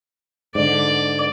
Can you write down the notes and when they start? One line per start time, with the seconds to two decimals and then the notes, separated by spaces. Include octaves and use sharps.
0.55 G#2 D3 D5